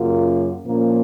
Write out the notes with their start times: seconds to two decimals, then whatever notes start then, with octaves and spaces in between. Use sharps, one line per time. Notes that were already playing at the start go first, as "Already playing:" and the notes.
Already playing: F#2 C#3 F#3 A#3 F4
0.64 A#2 F3 A#3 C#4